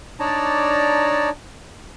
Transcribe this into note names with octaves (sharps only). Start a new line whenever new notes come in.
D4 D#4 C#5 D5 A5 A#5